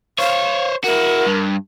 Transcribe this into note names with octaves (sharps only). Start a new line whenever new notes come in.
C5 C#5 F5
E4 F#4 A#4
G2